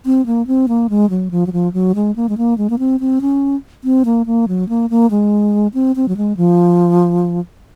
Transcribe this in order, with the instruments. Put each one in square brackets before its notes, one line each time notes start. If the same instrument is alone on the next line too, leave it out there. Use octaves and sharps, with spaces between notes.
[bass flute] C4
A#3
C4
A#3
G#3
F#3
F3
F#3
F3
F#3
G#3
A#3
G#3
A#3
G#3
A#3
C4
C4
C#4
C4
A#3
A#3
F#3
A#3
A#3
G#3
C4
C4
F#3
G#3
F3